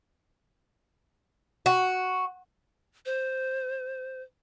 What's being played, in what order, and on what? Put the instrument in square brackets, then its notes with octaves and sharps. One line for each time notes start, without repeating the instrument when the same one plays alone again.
[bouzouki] F#4
[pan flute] C5